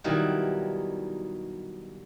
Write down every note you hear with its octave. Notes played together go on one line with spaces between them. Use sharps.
B2 D#3 F#3 G3 D#4 E4